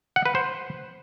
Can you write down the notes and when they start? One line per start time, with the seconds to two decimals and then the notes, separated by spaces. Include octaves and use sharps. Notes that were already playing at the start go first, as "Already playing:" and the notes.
0.16 F#5
0.26 B4
0.35 C5